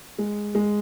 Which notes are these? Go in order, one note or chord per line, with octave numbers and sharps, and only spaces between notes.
G#3
G#3